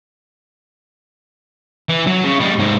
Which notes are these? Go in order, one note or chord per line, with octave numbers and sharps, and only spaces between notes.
E3
F#3
C#3
G3 G#3
G#2 C3